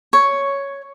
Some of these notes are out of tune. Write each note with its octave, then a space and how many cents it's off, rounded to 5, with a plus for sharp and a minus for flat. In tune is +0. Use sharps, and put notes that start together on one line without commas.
C#5 +5